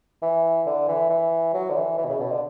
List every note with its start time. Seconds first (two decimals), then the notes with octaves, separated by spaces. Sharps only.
0.22 E3
0.66 D3
0.88 E3
1.10 E3
1.54 F#3
1.70 D3
1.76 E3
1.98 E3
2.05 B2
2.09 C#3
2.20 B2
2.31 D3